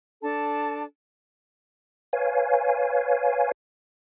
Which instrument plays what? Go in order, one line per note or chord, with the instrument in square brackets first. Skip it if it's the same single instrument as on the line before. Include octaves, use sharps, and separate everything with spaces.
[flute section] D4 A4 A5
[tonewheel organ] B4 C#5 F5 G#5